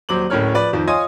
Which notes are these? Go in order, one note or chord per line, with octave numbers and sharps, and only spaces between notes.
D#1 F#3 C5 D6 F#7
D1 A2 C#4 A#4 C#5 F6
F3 B4 D5
F2 D#3 F3
F4 C#5 D#5 G#5 C6 D#6